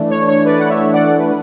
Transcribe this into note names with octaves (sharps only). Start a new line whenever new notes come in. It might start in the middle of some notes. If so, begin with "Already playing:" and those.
Already playing: E3 A3 D4
C#5
C#5
B4 D5
F#5
C#5 E5
D5 F#5
B4